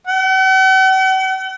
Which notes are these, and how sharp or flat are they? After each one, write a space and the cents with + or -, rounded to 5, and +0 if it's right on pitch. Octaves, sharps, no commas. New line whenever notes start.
F#5 +45